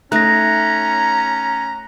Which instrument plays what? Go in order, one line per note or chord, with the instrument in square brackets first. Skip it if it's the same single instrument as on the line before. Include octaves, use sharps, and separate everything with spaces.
[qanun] A3 D#4 [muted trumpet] C#4 [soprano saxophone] A#5 [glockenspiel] F#6 A#6